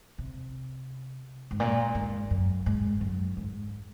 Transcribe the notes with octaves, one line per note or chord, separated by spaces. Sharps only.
C3
G#2
A#2
G#2
F#2
G#2
F#2
G#2